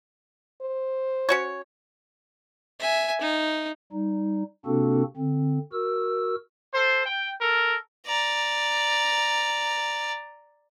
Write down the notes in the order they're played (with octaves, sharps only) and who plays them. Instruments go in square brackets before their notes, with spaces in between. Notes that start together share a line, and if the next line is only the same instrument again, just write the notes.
[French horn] C5
[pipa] C#4 F#4 C#5
[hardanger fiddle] E5 G#5
D#4
[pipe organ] G3 D#4
C3 A#3 C4 D4 F#4 A4
D3 C4
F#4 A#4 E6
[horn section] A4 C5
G5
A4 A#4
[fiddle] D5 A#5